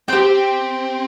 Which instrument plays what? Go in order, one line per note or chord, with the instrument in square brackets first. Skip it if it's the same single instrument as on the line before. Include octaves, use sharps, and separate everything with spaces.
[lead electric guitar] C4 [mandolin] G4 C5 G5